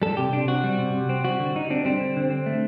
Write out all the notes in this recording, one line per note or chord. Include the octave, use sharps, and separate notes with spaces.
G3 A4
C3 G4
C3 D4
C4 F#4
G3
C3
C3
C4
G3 F#4
D3
D3 D#4
C4 D4
G3 C4
D3
D3
C4
A3